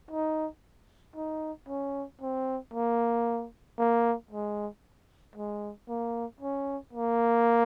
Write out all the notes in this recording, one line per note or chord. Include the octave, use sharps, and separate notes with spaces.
D#4
D#4
C#4
C4
A#3
A#3
G#3
G#3
A#3
C#4
A#3